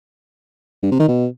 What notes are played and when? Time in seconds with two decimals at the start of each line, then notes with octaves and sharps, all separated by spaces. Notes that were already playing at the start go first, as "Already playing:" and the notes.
0.83 G2
0.91 C3
1.00 D#3
1.08 B2